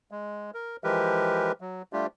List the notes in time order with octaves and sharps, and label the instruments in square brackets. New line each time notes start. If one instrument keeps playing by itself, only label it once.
[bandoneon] G#3
A#4
E3 F3 G#3 G4 A#4 B4
F#3
G3 A3 D4 F4 G4